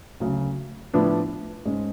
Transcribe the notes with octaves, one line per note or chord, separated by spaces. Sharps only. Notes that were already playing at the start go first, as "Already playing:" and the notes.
D2 C#3 F#3
A2 F3 B3 D4
G#2 G#3 C#4